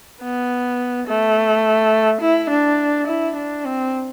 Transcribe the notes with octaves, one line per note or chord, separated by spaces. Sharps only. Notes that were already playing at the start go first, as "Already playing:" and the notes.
B3
A3
E4
D4
E4
D4
C4